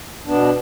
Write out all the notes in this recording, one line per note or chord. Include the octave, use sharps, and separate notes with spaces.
B2 B3 D4